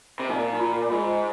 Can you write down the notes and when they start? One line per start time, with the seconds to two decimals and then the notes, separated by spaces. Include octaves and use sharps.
0.20 C3
0.29 A#2 D#4
0.53 D#4
0.60 F4
0.90 G#2 F4